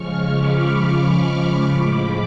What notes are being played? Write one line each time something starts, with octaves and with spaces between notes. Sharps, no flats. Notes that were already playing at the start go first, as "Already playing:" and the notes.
Already playing: C#3 F3 G#3 C#6 F6
B5 D6
A2 F3 G#3